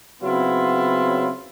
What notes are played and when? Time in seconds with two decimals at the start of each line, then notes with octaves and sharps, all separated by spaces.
0.23 C#3 F#3 B3 C4 E4 F4